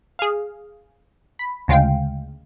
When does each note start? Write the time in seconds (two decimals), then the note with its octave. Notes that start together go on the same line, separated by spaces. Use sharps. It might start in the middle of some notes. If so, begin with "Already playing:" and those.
0.19 G#4 F5
1.39 B5
1.68 D2 C#3 G#3 F4 F5 G5